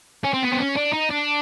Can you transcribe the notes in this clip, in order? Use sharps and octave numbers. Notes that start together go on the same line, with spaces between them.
C#4
C4
B3
C4
C#4
D4
D#4
D4